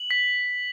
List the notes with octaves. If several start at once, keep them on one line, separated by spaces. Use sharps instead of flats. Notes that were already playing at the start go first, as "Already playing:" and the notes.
Already playing: F#7
B6